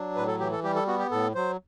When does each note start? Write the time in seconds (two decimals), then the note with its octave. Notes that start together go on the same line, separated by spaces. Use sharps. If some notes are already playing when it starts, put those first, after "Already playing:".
Already playing: F#3 D4
0.16 A2 B4
0.27 A4
0.40 E3 G4
0.51 A4
0.63 G3 G4
0.75 A4
0.87 B3 F#4
0.99 G4
1.11 A2 A4
1.35 F#3 C5